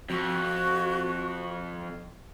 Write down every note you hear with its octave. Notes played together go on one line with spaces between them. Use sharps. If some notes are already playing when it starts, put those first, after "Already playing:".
F2 F#4